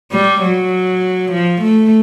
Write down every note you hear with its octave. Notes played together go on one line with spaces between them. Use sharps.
G3
F#3
F3
A3